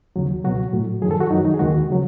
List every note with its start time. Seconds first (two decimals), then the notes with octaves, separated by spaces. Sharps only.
0.16 D#2 C#3 F#3
0.44 C#2 B2 F#3 F#4
0.73 A2 F#3
1.02 F#2 D#3 F#3 G#4
1.11 A4
1.21 F#4
1.30 F#2 D#3 F#3 D#4
1.45 D#4
1.54 G#4
1.59 D#2 D#3 G#3 F#4
1.90 C#3 F#3